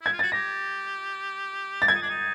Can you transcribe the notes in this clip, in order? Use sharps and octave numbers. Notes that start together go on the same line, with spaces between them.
E4 G#6
F4
F#4 A6
G4 A#6
A6
E4 G#6
D#4
D4
D#4